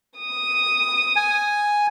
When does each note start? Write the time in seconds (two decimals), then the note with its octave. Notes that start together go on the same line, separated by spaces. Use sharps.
0.19 D#6
1.16 G#5